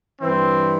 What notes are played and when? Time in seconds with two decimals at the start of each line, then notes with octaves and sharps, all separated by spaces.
0.21 G2 E3 C4